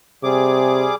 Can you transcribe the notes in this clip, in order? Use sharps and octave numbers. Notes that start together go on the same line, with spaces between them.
C3 G3 G#4 D6